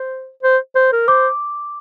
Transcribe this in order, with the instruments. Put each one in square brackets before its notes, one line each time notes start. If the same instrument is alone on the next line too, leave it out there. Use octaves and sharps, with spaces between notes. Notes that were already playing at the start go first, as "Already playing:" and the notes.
Already playing: [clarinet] C5
C5
C5
A#4
[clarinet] C5 [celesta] D6